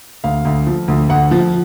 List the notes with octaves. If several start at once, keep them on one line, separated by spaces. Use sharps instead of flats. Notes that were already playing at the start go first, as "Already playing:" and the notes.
D2 F5
D2
F3
D2
D2 F#5
F3